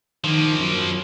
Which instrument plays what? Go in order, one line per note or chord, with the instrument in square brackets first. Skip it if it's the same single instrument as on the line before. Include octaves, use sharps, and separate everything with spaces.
[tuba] D#3 [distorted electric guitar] F3 A#3
[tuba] F#2